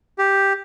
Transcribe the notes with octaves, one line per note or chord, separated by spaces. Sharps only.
G4